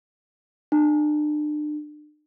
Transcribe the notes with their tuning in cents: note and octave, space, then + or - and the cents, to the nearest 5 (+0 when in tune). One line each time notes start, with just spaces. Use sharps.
D4 +35